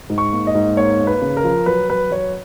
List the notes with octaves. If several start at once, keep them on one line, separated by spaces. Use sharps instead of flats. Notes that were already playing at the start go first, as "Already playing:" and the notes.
G#2
C#6
A#3
D#5
G#2
A#3 C#5
A#3
B4
C#3
A#4
F3
F#3 B4
F#3 B4
F#3 C#5